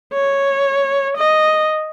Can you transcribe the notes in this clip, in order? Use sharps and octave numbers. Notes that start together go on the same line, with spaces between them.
C#5
D#5